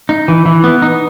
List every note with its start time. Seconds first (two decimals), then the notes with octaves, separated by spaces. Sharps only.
0.09 D#4
0.28 E3
0.46 E3
0.64 B3
0.82 D#4